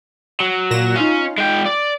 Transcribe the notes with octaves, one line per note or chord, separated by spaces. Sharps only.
F#3
A#2 A#6 E7
C#4 D#4 F4 F5
G#3 G5
D5